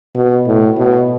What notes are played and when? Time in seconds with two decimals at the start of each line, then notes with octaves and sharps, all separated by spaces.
0.15 B2
0.47 A2
0.78 B2